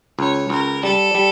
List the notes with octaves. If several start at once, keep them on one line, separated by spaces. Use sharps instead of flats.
C#2 C#5
C#2 A#4
G3 A4
G3